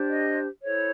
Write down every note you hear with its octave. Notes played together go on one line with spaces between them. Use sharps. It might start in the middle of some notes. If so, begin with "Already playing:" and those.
Already playing: D4 G4 C5
D#5
E4 A4 C5 C#5